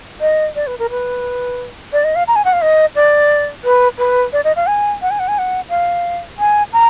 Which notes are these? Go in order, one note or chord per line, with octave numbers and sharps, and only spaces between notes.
D#5
D5
B4
A#4
B4
D5
D#5
F5
A#5
G#5
F#5
F5
D#5
D5
B4
B4
D5
D#5
F5
G#5
F#5
G#5
F#5
G#5
F#5
F5
G#5
A#5